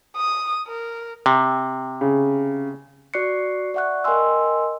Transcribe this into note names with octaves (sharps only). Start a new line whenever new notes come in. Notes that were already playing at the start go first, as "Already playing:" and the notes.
D#6
A#4
C3
C#3
F#4 D5 C#6 F#6 C7 C#7
D5 E5 F#5 C#6 F#6
A#4 D#5 G5 G#5 C6 E6